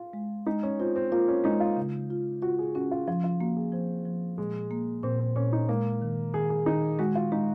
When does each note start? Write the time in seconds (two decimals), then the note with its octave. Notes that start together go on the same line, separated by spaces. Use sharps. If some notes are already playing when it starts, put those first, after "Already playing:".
Already playing: F4
0.13 G#3
0.47 G#3 D#4
0.63 C#4
0.79 C4 F4
0.96 C4
1.12 A#3 F4
1.28 C#4
1.44 G#3 D#4
1.60 F4
1.77 C#3
2.10 F4
2.42 F4 F#4
2.59 G#4
2.75 C#4 F#4
2.91 F4
3.08 F3 F4
3.24 F4
3.40 A#3 F#4
3.56 G#4
3.72 F3 C4
4.05 F3
4.38 A#2 G#3
4.71 A#3
5.03 A#2 C4
5.20 C4
5.36 A#2 C#4
5.53 D#4
5.69 G#3 A#3
6.02 D#3
6.34 D#3 G#4
6.50 G#4
6.66 D#3 D#4
6.99 G#3 F#4
7.15 F4
7.32 G#3 D#4